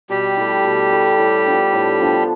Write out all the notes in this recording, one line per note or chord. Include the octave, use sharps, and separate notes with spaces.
B2 G3 G4
A3 E4
B2
A3 E4
A2
F3 B3 D4
A2
F3 B3 D4